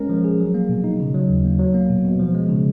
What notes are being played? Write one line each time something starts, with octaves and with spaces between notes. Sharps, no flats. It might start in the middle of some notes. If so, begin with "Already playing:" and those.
Already playing: G#3 C#4 A#4
F3
G#4
F#3
A#3
B2
D#4
C#3
F#3
D#2
A#3
F#3
A#3
B2
B2
F3
G#3
C#3